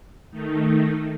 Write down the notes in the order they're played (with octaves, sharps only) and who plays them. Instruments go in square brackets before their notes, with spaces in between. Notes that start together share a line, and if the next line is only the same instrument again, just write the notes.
[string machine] D#3 A3 D#4